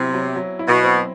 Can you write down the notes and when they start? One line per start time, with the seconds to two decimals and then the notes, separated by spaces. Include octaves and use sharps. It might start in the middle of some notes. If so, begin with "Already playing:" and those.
Already playing: C3 F#3 C4 E4
0.14 F#3
0.36 F#3
0.59 E4
0.67 B2
0.83 C4